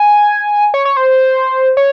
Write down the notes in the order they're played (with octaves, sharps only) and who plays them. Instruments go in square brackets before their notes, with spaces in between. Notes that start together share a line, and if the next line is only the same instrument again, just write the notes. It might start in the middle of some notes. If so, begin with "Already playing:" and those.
Already playing: [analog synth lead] G#5
C#5
C#5
C5
C#5